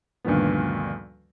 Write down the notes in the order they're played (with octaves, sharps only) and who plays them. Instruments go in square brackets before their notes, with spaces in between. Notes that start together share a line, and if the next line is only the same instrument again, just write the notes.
[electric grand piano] D2 G2 A#2 D#3 F3 B3